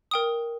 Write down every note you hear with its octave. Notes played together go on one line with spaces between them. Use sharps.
A#4 G5 D#6